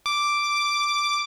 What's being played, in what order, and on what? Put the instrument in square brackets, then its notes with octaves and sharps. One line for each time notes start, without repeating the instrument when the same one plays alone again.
[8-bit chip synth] D6